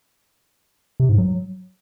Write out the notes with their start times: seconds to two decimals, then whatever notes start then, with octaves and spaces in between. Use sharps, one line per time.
1.00 C3
1.09 G#2
1.18 F#3